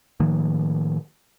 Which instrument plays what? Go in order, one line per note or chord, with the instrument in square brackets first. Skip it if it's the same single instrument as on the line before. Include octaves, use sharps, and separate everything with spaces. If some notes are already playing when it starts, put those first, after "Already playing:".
[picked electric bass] A2 D#3 F3 A#3